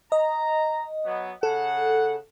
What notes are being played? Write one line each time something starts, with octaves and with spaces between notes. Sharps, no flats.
D#5 A#5
F#3 B3
C#3 A4 F#5